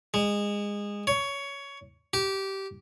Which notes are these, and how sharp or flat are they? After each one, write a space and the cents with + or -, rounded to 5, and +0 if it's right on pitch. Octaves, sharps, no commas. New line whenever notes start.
G#3 -20
C#5 +15
G4 -15